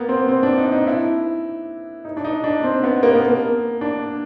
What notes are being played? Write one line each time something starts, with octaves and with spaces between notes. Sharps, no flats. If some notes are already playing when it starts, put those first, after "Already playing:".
Already playing: A#3 B3
C4
C4
D4
D#4
D#4
E4
D#4
D4
D#4
D4
C4
B3
A#3
B3
A#3
D4